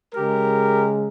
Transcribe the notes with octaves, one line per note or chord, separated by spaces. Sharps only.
C#3 G#3 G4 A#4